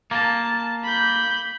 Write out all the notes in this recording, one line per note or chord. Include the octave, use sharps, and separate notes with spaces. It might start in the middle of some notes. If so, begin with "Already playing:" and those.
A#3 A5
B5 G6